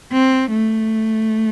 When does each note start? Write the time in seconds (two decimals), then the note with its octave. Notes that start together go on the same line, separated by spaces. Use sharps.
0.12 C4
0.51 A3